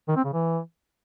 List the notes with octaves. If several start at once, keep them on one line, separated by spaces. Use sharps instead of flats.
D#3
C4
C#3
E3